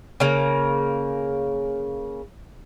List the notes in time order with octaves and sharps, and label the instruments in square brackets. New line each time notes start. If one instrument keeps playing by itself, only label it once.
[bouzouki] C#3 A#3